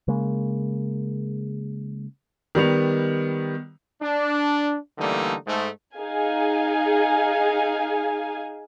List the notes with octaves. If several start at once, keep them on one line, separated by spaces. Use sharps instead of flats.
C#3 G#3 A#3
D#3 G3 B3 F7
D4
D3 E3 G3 A3 A#3 D#4
G#2 A3
D#4 G#4 F5 G#5